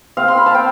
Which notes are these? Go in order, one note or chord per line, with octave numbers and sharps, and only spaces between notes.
C4 F5
C6
B5
A5
C4 G5